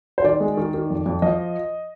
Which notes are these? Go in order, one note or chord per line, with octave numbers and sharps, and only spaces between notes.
C5
D#3 D5
G#3
D#3
D#3
F2
F2
F3 D#5